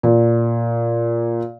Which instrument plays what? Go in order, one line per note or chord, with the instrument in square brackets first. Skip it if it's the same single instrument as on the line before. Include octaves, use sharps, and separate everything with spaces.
[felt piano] A#2